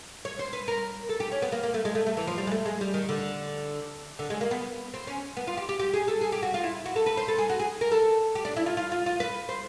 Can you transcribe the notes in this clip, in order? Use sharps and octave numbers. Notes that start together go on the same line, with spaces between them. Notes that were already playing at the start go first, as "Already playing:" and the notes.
C#5
C5
B4
A#4
A4
G4
C#4
B3
A#3
A#3
A3
G#3
A3
A3
E3
F3
G3
G#3
A3
G#3
G3
D#3
D3
D3
G#3
A#3
B3
C4
C#4
B3
F4
G4
G4
G4
G#4
A4
G#4
G4
F#4
F4
E4
F#4
A4
B4
C5
A4
G#4
F#4
G#4
A#4
A4
G4
D4
E4
F4
F4
F4
F4
B4
C5